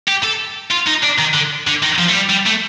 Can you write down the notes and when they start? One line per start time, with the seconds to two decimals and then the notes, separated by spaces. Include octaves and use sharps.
0.08 G4
0.24 A4
0.72 F4
0.88 D#4
1.04 D4
1.19 D#3
1.34 D3
1.67 D3
1.83 D#3
1.99 F3
2.09 A3
2.14 G3
2.30 G3
2.47 A3